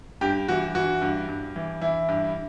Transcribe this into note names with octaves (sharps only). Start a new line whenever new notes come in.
G2 G4
E3 F#4
E3 F#4
G2
G2
E3
E3 E4
G2